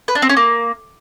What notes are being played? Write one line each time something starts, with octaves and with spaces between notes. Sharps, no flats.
B4
D4
C4
C#4
A#3